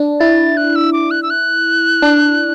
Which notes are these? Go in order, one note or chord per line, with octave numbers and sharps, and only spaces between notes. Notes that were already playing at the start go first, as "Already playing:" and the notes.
Already playing: D4
E4 A6
F#6
E6
D6
F#6
E6
F#6
D4